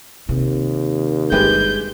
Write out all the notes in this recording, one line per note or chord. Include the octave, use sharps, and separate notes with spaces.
D#2 C3
G1 G#3 D4 G4 B4 G6